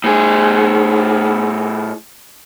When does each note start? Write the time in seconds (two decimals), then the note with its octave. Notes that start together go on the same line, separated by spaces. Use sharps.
0.04 A2 G#4